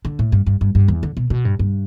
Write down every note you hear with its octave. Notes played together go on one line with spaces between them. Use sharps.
D3
A2
G2
G2
G2
G2
E2
D3
B2
B2
G2
G2